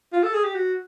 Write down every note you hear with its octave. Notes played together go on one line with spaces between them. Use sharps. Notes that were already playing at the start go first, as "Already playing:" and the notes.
F4
A4
G#4
G4
F#4